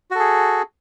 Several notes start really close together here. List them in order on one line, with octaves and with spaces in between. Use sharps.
F#4 A4 G#4